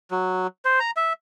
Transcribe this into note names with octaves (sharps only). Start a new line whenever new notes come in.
F#3
C5
A#5
E5